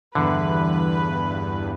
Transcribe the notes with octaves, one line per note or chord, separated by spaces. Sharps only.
E2 G2 D3 E3 B4